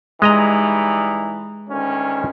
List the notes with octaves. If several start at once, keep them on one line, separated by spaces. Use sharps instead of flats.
E3 G3 G#3 D#4 D#5 A#5
D2 D#3 C#4